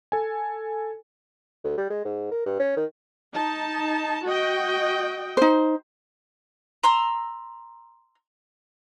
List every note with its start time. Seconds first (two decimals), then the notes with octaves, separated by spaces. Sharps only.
0.12 A4 G#5
1.64 D2
1.77 G3
1.90 G#3
2.05 G#2
2.32 A#4
2.46 G2
2.59 C#4
2.77 D#3
3.33 D#4 A5
4.25 F#4 D#5 G5
5.37 D#4 C5
6.84 A#5 C6 E6